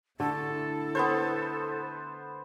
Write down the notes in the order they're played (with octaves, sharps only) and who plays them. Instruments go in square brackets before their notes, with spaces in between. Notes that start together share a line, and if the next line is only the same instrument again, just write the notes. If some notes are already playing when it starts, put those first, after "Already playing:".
[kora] D3 A3 [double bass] E4 [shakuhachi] A4
[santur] B3 B4 C5